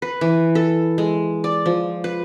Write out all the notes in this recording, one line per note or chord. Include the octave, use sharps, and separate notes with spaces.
B4
E3
A4
G#3
D5
F3
B4